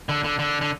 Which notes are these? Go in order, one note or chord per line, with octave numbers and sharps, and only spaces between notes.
D3
D3
D3
D3